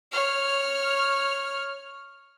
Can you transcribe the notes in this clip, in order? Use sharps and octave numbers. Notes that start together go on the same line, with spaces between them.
C#5 F6